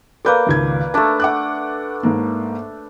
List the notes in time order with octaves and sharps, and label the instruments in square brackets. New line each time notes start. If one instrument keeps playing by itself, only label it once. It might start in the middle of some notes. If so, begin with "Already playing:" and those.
[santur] A#3 B4 D5 [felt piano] A4 G6
[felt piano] G#1 C#2 G#6
[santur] A3 D4 [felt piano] B4 A5
[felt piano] F#5 D6 F#6
G#2 A#3